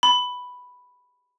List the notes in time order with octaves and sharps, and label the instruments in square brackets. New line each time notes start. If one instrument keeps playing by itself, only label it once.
[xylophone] B5